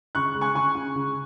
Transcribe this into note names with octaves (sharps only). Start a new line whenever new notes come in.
C#3 C#6 F#6
G#3
G#5 C#6
C#3 G#5 C#6
C#3
C#3